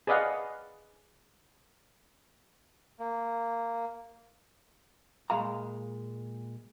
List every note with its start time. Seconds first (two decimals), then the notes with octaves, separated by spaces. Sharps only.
0.07 G#4 B4 D5 D#5 F5 F#5
3.00 A#3
5.30 A#2 G#3 F5 A#5